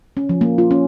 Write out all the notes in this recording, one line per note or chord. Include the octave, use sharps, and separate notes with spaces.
C#4
F3
A#3
F4
C#4